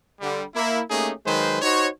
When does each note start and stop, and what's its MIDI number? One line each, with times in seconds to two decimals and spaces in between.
0.21 0.44 50
0.21 0.44 55
0.55 0.80 58
0.55 0.80 64
0.90 1.12 57
0.90 1.12 58
0.90 1.12 61
0.90 1.12 63
0.90 1.12 67
0.90 1.12 68
1.25 1.59 51
1.25 1.59 54
1.25 1.59 56
1.25 1.59 71
1.25 1.59 72
1.62 1.87 63
1.62 1.87 66
1.62 1.87 72
1.62 1.87 73